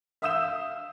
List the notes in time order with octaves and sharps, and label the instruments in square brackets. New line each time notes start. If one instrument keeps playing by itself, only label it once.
[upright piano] E5 F5 D#6 E6 G6 E7